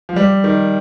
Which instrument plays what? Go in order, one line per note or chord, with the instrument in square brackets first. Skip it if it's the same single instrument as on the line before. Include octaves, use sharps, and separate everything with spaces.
[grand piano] F3
G3
D#3